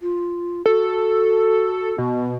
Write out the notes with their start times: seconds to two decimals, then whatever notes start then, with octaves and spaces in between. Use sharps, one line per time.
0.01 F4
0.66 F#4 A4
1.98 B2 B3